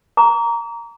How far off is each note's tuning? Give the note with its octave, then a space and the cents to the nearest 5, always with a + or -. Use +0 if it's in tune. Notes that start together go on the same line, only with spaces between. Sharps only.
A#5 -5 D6 -40